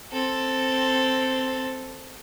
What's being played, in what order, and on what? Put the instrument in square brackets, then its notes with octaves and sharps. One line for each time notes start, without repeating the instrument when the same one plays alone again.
[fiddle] C4 A4